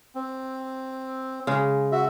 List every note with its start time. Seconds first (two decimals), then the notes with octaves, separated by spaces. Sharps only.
0.15 C4
1.47 C#3 G#3
1.92 F#4 E5